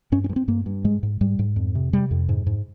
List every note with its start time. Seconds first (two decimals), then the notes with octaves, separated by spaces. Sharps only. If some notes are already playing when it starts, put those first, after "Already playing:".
0.12 G2 C#4
0.24 C#4
0.29 G2
0.36 C4
0.48 G2 A#3
0.66 G2
0.84 G#2 G#3
1.03 G#2
1.21 G#2 G3
1.39 G#2
1.56 F2
1.75 C3
1.93 C3 G3
2.11 F2
2.29 G#2
2.46 G#2